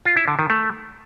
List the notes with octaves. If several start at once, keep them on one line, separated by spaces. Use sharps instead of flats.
F4
E4
D3
D#3
A3